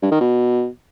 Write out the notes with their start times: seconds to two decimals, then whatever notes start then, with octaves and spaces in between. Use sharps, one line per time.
0.02 G2
0.12 D#3
0.21 B2